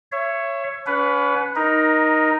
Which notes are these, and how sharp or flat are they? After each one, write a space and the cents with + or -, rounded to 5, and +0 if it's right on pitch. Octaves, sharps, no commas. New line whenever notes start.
C#5 +0 E5 +30
C#4 +35 B4 +10 F#5 -15
D#4 +0 A#4 +20